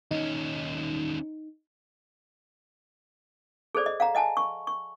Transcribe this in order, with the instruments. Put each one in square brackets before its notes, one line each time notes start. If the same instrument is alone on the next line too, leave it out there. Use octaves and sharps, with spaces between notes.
[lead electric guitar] D#2 C#4 [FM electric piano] D#4
[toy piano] G#4 A4 C5 D5
D#5
F5 F#5 A#5
D#5 F#5 G#5 A5
C#6
C#6